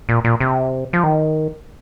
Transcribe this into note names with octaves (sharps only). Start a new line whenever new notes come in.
A#2
A#2
C3
F3
D#3